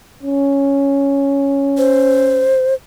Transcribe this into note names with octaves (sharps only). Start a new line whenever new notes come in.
C#4
C5